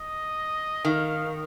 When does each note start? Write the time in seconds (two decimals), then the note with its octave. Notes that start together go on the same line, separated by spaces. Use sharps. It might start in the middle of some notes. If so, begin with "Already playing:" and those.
Already playing: D#5
0.85 D#3 F5